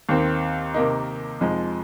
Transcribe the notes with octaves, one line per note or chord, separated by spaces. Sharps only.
D#2 D#3 C4
C3 D#3 A#3 D#4
F2 F3 G#3 D#4